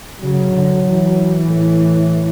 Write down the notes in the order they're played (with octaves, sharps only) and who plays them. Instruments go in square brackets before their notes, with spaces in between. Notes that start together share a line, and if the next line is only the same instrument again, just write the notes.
[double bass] C#3 [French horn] F#3
[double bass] D3
E3
[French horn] A2